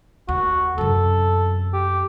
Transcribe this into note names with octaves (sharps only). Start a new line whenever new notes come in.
D#2 F#4
F#2 C3 A4
G4